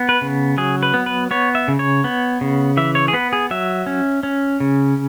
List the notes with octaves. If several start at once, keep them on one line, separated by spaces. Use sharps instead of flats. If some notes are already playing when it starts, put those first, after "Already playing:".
Already playing: B3
B4
C#3
F#3 G#4
B4
B3
B4
B3 C#5
E5
C#3
C#5
B3
C#3
E3 E5
C#5
G#4
B3 B4
G#4
F#3 E5
C#4
C#4
C#3